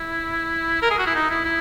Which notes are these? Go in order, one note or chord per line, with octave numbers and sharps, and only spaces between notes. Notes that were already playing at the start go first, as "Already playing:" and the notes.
Already playing: E4
A#4
G#4
F#4
E4
D#4
E4
E4